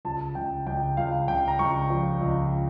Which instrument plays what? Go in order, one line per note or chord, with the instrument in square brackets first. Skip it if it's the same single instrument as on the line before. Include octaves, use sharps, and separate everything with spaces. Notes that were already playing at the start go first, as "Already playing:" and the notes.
[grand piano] C#2 A5
C#2 G5
C#2 G5
C#2 F5
C#2 G5
A#5
C#2 C#6
F3
C#2